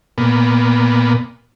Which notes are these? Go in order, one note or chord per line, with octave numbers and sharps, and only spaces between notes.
A#2 B3